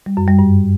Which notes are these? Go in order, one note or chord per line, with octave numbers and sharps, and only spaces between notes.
G3
F#2
G3
G2